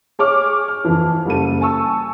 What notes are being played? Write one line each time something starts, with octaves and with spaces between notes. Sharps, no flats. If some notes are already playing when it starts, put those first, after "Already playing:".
G#4 C#5 D6 F6
F6
F2 E3
F#1 G3 A4 D#7
G#5 A5 C#6 E6